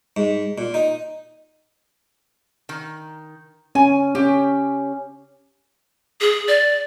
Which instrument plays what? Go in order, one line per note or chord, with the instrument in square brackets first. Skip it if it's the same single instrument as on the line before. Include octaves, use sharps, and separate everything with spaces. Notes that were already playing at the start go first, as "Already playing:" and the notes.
[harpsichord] G#2
A#2
D#4
[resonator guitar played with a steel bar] D#3
[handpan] C#4 [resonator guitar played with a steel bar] G#5
[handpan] C#4 [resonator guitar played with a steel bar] G4
[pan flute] G#4
D5